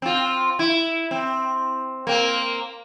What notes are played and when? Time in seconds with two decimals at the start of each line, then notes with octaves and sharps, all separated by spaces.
0.02 C4 F4
0.59 E4
1.11 C4
2.07 A#3 C4